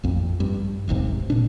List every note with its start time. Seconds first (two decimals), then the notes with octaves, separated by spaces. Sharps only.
0.03 A1 F2
0.40 G2
0.88 D#1 G#1 D#2 C3
1.30 A#2 D4